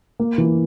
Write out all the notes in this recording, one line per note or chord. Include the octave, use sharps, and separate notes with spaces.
A#3
E3